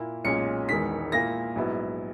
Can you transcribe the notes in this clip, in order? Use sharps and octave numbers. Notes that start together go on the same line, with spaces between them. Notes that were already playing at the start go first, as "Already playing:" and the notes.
Already playing: A#2 A#3 E4
B1 A#2 G#3 C#4 C#7
E1 E2 D#3 G#3 B6
A#2 A#3 E4 A#6
A#1 G#2 F#3 B3 E4